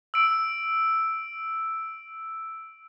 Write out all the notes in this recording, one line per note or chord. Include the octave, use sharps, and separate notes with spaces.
E6 D7